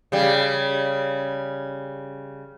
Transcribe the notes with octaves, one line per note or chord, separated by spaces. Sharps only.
C#3 G3